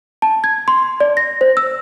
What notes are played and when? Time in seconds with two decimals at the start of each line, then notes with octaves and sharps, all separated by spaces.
0.22 A5
0.44 G#6
0.68 C6
1.00 D5
1.17 A#6
1.41 C5
1.57 E6